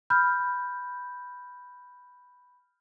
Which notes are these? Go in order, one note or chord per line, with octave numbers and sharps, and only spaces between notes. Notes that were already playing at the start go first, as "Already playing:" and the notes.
B5 F6 G6